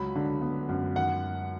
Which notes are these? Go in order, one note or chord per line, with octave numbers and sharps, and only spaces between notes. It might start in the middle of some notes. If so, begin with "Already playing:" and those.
Already playing: C#2 F#3 B5
D3
B3
F#2
D#3 F#5